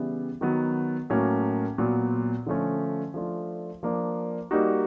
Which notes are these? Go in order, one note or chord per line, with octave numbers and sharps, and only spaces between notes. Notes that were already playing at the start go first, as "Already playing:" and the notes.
Already playing: C#3 E3 G3 B3 E4
D#3 F#3 B3
A2 F#3 A#3 C#4
A#2 F#3 B3
D3 F3 A3 C#4
F3 A3 D4 F4
F3 A#3 D4
G3 A#3 D#4 F#4